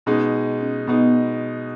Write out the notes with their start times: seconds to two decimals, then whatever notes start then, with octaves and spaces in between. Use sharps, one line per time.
0.06 B2 G#3 C#4 D#4
0.61 C#4
0.87 B2 G#3 B3 D#4